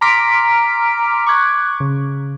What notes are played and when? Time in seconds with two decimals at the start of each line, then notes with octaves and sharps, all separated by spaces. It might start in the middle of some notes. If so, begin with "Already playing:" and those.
0.01 A#5 C6 D6 F6 B6 D7
1.26 C#6 D6 F#6 G#6
1.80 C#3